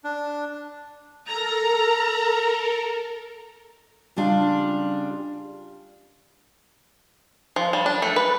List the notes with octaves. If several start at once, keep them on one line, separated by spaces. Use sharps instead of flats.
D4
A4 A#4 A#5
C#3 G3 D4 F4
F3
G3
D4
A3
B4